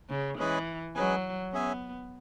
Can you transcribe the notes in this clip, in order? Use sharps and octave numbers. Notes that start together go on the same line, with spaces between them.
C#3
E3 G#3 C#4 G#4 B4 G#5
F#3 G#3 C#4 G#4 B4 G#5
B3 C#4 G#4 E5 G#5